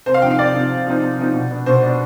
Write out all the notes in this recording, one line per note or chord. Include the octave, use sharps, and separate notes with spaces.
C3 C5
F5
F3 C4 D#4 G5
F5
C3 D5
F3 C4 D#4
C3
F3 C4 D#4
C3
F3 C4 D#4
B2
B3 D4
B2 C5
B3 D4